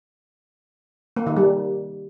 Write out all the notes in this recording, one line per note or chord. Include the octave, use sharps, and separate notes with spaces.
A#3
D#3
G3